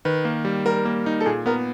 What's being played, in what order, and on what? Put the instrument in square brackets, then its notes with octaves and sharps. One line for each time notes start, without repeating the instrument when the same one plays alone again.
[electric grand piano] D#3 [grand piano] B4
[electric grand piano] A#3
G3
[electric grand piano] G3 [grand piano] A#4
[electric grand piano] A#3
D#4
[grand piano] A4
[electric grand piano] A#2 [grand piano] G#4
[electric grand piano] B3 [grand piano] A#4